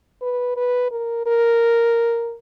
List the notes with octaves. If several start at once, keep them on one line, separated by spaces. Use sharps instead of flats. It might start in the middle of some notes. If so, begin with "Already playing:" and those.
B4
B4
A#4
A#4